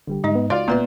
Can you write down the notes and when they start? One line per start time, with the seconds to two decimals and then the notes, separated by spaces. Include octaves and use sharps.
0.07 F1 D3 G3 G4
0.24 G#2 G#3 D#4 D#5
0.35 B3
0.50 C#2 F4 F#4 D5 C6
0.68 D1 A#2 B3 B4 E5